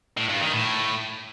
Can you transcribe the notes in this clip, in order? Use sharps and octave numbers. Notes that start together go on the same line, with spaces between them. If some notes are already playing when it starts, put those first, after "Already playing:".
A2
G2
D#3
A2